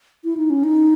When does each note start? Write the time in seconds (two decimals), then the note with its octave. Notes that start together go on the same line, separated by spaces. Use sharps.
0.24 E4
0.37 D#4
0.50 C#4
0.64 D#4